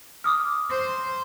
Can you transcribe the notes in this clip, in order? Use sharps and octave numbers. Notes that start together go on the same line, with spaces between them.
D6 D#6 F6
C5